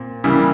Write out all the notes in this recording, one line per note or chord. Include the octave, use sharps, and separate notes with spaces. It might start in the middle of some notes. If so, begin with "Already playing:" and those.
Already playing: A#2 C4
C#3 E3 G3 A#3 E4